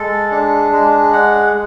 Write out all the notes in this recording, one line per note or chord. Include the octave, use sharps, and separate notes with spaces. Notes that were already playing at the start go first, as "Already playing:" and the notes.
Already playing: G#3 A4
D4
G#3
F#5